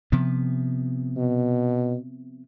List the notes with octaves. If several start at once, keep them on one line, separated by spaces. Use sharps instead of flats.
C3 F3 B3
B2